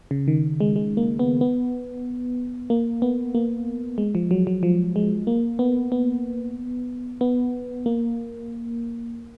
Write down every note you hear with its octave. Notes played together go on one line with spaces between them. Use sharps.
C#3
D#3
G#3
G#3
A#3
B3
B3
A#3
B3
A#3
G#3
F3
F#3
F#3
F3
G#3
A#3
B3
B3
B3
A#3